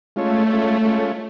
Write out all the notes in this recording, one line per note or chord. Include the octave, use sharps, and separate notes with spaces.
G#3 A3 C#4 F4 A4 C#5
G#3 C#4 F4 A4 C#5
G#3 C#4 F4 A4 C#5